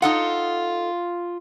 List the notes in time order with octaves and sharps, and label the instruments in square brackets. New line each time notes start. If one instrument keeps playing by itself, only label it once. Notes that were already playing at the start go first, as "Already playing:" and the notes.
[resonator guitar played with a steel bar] D#4 A4 F#5 [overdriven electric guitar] F4